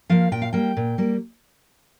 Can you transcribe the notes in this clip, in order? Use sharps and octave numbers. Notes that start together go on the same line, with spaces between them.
F3 A#3 F5
A#2 G5
F5
G3 A#3 G5
A#2
G3 A#3